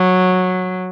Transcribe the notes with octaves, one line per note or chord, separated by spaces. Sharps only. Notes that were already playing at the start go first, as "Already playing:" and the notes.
Already playing: F#3